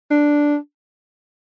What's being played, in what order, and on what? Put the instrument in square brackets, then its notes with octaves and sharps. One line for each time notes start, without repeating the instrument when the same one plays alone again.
[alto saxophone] D4